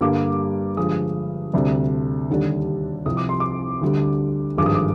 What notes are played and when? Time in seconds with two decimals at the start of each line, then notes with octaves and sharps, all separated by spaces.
0.01 G2 D3 G3 A#3 D6
0.77 G1 G2 F3 G#3 D#6
1.53 D2 C3 G3 D4
2.30 D#2 D3 G3 D4
3.05 C2 C3 F3 D#6
3.17 D6
3.29 C6
3.40 D6
3.81 D2 D3 G3
4.58 G#1 G2 F3 G#3 D6
4.66 D#6
4.75 D6